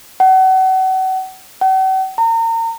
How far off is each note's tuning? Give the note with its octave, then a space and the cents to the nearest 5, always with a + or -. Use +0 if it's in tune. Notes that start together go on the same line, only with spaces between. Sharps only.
F#5 +35
F#5 +45
A#5 -35